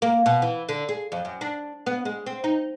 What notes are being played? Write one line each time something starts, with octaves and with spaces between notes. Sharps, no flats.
A#3
B2
E3
D3
G#4
F2
F#2
D4
B3
G#3
C4
D#4